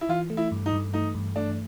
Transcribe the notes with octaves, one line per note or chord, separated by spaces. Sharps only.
E4
E3 F4
A3
E4
G2
D#4
G2
A3 D#4
G2
A3 D4